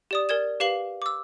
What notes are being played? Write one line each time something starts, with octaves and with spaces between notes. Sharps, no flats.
G4 D5 D#6
A#4 D5 G#6 E7
G4 B4 F5 C7 F#7
D6 E6